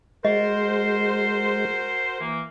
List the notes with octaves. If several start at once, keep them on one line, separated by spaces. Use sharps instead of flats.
G#3 F#4 A#4 C5 D#5
E3 A#3